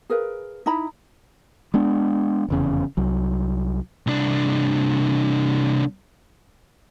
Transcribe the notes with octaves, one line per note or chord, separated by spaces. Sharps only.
G#4 A#4 B4 F5
D#4 E4 A#5 B5
G#3 B3 D4
F1 E2 C#3
C2 F#3
C2 D4